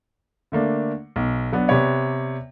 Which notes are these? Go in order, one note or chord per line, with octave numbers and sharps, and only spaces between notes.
D3 A3 A#3 D4
B1
F#3 B3 D4
C3 B3 G4 B4 C#5 D5